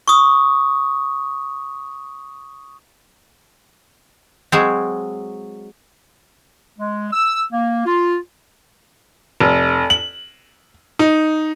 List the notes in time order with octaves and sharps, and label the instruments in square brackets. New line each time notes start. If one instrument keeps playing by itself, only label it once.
[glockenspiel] C#6 D#6
[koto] F#3 G#3 C4
[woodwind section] G#3
E6
A#3
F4
[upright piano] F1
F#7
D#4